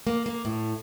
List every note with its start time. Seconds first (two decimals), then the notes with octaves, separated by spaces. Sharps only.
0.07 A#3
0.26 A#3
0.45 A2